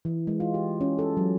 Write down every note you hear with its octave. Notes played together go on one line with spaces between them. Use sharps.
E3
G#3
F4
G4
C#4
A4
F#3